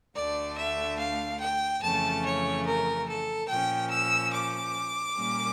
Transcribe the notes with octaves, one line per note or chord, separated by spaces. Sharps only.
D2 D3 A3 D4 D5
E5
F5
G5
F2 C#3 E3 A3 C#4 A5
C#5
A#4
A4
A#2 F3 C#4 G5
E6
D6
A#2 G3 A#3 C#4